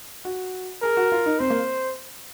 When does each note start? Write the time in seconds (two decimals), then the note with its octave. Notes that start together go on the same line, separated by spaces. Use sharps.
0.25 F#4
0.82 G#4 A#4
0.97 F#4
1.12 F4
1.26 D#4
1.40 C4 C5
1.50 A#3